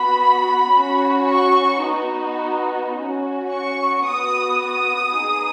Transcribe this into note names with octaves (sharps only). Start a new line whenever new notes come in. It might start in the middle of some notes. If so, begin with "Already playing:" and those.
Already playing: B3 F#4 B5
C#4 F#4
C#6
B3 D#4 F#4
C#4 F#4
C#6
B3 F#4 D#6
D#6
B3 D#4 G#4